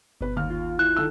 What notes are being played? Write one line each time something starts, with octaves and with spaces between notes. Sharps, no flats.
G1 B2 B4
D#2 F6
F4
E4 F#6
D#3 A4 E6